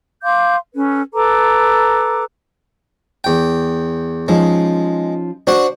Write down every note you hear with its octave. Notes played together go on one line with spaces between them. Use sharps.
F5 C6 D6 G6
C#4 A4 B4
A4 B4 A#5 D6
E2 G5
F3 G#3 C#4 D#4
D4 F#4 C5 D5 F#5